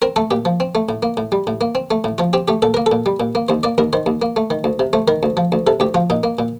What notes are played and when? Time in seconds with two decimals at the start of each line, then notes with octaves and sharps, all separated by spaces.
0.02 C4 A#4
0.16 A3 A4
0.31 A#2 G4
0.45 F3
0.60 C4
0.75 A3
0.89 A2
1.03 A#3
1.17 A2
1.32 G3
1.47 A2
1.61 A#3
1.75 C4
1.91 A3
2.04 A2
2.18 F3 F4
2.33 C4 G4
2.48 A3 G4
2.62 A#2 A4
2.74 A#3 A#4
2.86 A4
2.92 A#2
3.06 G3
3.20 A#2
3.35 A#3
3.49 D#2 C5
3.63 A#3 D5
3.78 D#2 A#4
3.93 D#3 C5
4.06 D#2
4.22 A#3
4.36 A3
4.50 D#3
4.64 D2
4.79 C3
4.93 A3 C5
5.08 D#3 A#4
5.23 D2
5.37 F3
5.52 D2
5.67 C3 A4
5.80 D2 G4
5.94 F3 F4
6.10 A#2 D#4
6.23 A#3
6.39 A#2